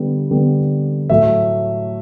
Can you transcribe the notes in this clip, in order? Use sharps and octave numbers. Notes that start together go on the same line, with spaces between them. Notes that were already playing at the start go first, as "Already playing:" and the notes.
Already playing: D3 G3 B3
D3 G3 B3
A2 F#3 A3 E5